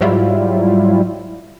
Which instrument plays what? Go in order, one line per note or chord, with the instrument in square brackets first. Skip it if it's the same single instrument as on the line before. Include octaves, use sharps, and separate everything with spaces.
[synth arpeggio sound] G#2 F#3 G3 E4 F4